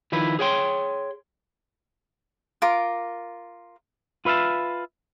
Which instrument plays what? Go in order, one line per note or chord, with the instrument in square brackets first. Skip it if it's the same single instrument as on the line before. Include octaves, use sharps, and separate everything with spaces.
[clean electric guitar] D#3 F3 E4 B4
G#4 C#5 G5 C6
[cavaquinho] F4 A#4 D6
[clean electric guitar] F4 B4 E5 F5 A5